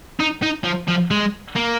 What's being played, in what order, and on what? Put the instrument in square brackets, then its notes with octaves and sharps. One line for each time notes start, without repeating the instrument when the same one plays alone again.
[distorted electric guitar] D#4
D#4
F3
F3
G#3
A#3